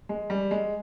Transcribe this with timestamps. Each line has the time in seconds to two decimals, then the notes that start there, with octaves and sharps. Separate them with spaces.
0.09 G#3
0.30 G3
0.51 G#3